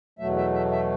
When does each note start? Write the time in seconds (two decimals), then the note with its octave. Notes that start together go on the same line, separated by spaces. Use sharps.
0.19 E2 B2 F#3 A3 E5
0.37 E5
0.54 E5
0.72 E5